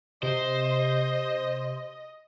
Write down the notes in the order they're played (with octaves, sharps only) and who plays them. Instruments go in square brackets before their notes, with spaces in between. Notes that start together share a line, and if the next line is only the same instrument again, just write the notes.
[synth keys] C3 [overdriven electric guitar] C5 [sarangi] D#5